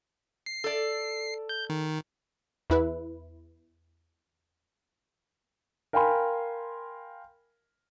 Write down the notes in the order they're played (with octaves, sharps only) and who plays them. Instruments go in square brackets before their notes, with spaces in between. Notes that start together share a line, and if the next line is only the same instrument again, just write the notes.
[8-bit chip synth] C7
[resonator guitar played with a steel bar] A4 D5
[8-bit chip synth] G6
D#3
[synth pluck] E2 E4 B4
[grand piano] A#4 F5 G5 G#5 B5 C6